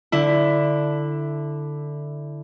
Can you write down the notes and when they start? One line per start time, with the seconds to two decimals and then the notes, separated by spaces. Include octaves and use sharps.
0.12 D3 E4